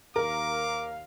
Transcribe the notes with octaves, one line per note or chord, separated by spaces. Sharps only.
D#2 A#4 F5 D6